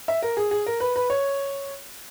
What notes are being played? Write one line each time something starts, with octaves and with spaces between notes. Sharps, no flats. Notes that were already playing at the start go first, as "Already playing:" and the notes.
E5
A#4
G#4
G#4
A#4
B4
B4
C#5